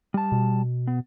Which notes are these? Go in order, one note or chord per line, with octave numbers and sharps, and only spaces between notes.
G3 A5
B2
B3